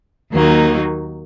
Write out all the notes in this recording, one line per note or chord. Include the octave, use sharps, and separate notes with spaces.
D#2 D#3 F#3 A#3 D#4